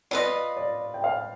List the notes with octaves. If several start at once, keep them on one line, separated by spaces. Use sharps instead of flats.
F4 B4 D5 D#5
D5
G5
F5